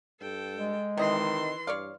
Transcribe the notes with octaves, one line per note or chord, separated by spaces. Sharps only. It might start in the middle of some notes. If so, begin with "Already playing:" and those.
G2 A4 G5
G#3
C3 D#3 E3 D#5 C6
G2 C#5 D5 F5